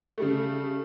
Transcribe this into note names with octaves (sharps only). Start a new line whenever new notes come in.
C#3 G3 A3